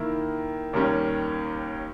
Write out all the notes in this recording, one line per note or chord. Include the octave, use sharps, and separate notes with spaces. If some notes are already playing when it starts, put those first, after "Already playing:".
Already playing: D#3 A#3 E4
D#2 D#3 G3 C#4